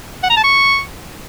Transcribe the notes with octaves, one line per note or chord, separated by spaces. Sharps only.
F#5
A#5
A5
C#6